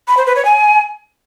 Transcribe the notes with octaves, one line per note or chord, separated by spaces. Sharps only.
B5
C5
B4
C#5
G#5